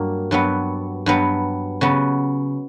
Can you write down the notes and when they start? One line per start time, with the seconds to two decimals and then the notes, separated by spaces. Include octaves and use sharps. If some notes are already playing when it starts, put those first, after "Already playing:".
Already playing: G2 F#3 A#3 A#4
0.31 G2 F#3 B3
1.06 G2 F#3 B3
1.81 C#3 F#3 B3